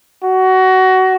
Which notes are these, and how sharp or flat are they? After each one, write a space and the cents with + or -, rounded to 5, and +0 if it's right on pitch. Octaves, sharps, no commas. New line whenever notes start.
F#4 +20